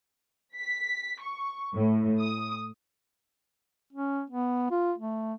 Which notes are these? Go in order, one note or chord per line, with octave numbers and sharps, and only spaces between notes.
B6
C#6
A2
D#6
C#4
B3
F4
A3